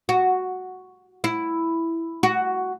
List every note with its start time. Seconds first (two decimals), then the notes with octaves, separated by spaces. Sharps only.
0.09 F#4
1.24 E4
2.23 F#4